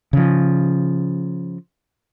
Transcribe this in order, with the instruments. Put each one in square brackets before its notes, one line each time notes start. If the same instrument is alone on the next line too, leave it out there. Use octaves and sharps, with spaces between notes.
[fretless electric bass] C#3 F3